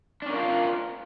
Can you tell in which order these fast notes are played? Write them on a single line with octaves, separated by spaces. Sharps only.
D4 C#4 A#4 F4